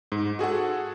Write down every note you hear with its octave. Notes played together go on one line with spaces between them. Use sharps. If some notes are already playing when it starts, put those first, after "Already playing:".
G#2
F#4 G#4 A4 F#5